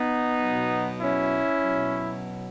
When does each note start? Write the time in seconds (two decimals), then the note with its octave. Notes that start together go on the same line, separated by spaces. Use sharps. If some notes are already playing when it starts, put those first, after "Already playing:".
Already playing: B3 D#4
0.40 B2 F#3
1.02 C#4 E4
1.63 B2 F#3